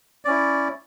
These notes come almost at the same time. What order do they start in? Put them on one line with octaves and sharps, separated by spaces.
D5 C#4 E4